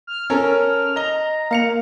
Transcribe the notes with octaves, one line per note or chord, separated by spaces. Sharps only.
F6
C#4 A4 A#4
D#5 A#5 G7
A#3 F5 C#7 F7